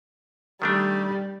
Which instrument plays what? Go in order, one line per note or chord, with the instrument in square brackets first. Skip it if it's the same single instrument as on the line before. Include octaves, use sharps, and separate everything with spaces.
[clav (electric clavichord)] D#3 A3 D4 [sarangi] G3